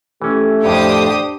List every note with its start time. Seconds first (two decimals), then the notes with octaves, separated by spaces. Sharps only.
0.22 E3 A3 C#4 G4
0.64 F2 A2 D4 G4 C5 C#5 D#6